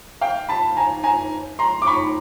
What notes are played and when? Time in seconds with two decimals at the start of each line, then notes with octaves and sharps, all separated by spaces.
0.21 F5 G5
0.49 A5 B5
0.77 G#5 A#5
1.04 G#5 A#5
1.59 A#5 C6
1.82 D6
1.86 B5 C#6